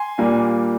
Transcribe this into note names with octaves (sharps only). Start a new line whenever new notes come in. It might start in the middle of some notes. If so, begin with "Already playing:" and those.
Already playing: G#5 C6
A#2 G3 A#3 D4